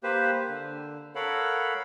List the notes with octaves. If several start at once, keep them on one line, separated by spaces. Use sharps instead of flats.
A#3 G4 B4 C5
D3
A4 A#4 C#5 F5 F#5 B5